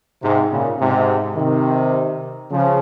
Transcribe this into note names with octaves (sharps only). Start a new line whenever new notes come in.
G#2 C3
A#2 C#3
G#2 C3
C3 D#3
C#3 F3